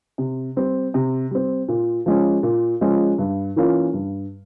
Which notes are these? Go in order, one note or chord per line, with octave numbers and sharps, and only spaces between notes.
C3
G3 C4
C3
G3 C4
A#2
F3 G#3 C#4
A#2
F3 G#3 C#4
G2
E3 A#3 C#4 F4
G2